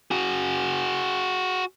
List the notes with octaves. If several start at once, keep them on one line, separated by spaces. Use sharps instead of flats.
F#4 G#4